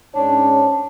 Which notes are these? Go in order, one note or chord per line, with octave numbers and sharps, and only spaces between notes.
G#2 C#4 D4 C#5